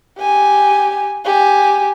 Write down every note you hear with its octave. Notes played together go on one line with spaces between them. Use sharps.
G4 G#5
G4 G#5